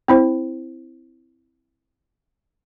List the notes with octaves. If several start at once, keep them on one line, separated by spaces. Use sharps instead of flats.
C4 E4 C5